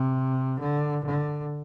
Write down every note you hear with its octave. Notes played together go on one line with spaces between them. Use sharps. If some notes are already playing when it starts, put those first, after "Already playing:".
Already playing: C3
D3
D3